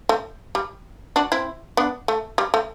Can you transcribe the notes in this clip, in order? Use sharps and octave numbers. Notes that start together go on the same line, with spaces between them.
A3
G3
D4 F#4
C4 E4
B3 D4
A3
G3
A3